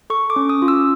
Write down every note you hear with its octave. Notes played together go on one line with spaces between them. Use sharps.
A4 C#6
D6
C#4
D#6
F4
E6